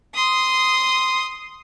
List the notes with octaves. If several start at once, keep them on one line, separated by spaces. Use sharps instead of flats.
C6 D#6